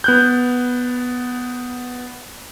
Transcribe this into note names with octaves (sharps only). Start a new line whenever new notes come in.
B3 F#6 G6